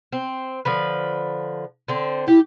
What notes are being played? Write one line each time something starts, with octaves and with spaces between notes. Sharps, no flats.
C4
D3 F3 B4
D3 C4
E4 G4